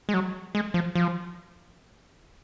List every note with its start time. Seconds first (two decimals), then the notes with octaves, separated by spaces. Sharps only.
0.09 G#3
0.14 F#3
0.55 G#3
0.74 F3
0.95 F3